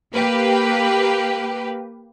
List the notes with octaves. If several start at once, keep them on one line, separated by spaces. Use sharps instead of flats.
A#3 G4 B4